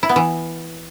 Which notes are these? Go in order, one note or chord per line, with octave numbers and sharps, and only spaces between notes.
E4
B3
E3